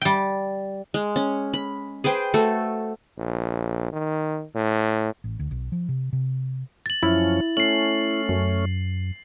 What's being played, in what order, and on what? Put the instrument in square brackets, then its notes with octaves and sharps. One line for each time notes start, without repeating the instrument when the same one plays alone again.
[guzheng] G3 G5
[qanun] G#3
C#4
B5
G#4 B4 C5 G5
A3 F#4 A4
[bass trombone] A#1
D#3
A2
[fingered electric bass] A1
D2
B1
F3
C3
C3
[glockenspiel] A6 F#7
[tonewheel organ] F#2 F3 C#4 [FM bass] E4
[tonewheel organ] A3 C#4 [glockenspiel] C7 F#7
[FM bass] F#2